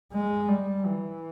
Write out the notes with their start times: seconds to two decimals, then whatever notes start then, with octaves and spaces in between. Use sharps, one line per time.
0.13 G#3
0.48 G3
0.85 E3